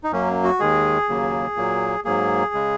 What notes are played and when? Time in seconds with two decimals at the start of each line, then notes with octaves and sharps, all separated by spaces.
0.04 D#4
0.11 F#2 F#3 A#3 C#4
0.44 F#4
0.59 D#2 D#3 G#3 G#4
1.09 D#2 C#3 F#3 A#3
1.57 A#2 F#3 A#3
2.04 G#2 F#3 A#3 G#4
2.54 C#3 G#3